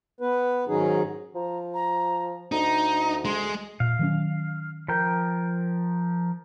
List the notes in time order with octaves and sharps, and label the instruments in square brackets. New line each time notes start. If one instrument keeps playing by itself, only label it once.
[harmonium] B3 B4
G#2 D#3 F#3 C#4 D#4 G#4
[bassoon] F3 [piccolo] A#5
[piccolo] A#5
[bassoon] D2 [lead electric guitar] D#4 [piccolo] A#5
[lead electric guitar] G#3 [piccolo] C6
[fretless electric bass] A#2 [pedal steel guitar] F5
[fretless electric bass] D#3 F#3 C#4
[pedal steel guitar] F3 A#4 G5